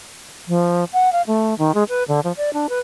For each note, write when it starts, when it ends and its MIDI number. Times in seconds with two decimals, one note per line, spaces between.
0.48 0.84 53
0.93 1.12 78
1.12 1.22 77
1.27 1.57 57
1.59 1.74 51
1.74 1.84 56
1.89 2.03 71
2.08 2.20 50
2.24 2.32 53
2.37 2.53 74
2.53 2.67 62
2.69 2.79 71